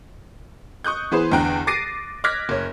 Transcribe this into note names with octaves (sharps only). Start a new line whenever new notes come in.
C#6 D#6 F#6 G6
E3 B3 G#4 B4 C5
E2 D3 G5 A#5 F#6
D6 A6 A#6 C7 D7 D#7
D6 F6 F#6 G#6 A#6 B6
F#1 C#5